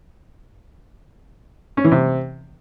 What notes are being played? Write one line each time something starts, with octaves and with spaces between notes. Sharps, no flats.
C#4
E3
C3